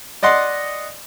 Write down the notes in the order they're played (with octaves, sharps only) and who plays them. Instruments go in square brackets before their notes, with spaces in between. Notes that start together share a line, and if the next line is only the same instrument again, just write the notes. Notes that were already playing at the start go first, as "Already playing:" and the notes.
[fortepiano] D5 D#5 F#5 C6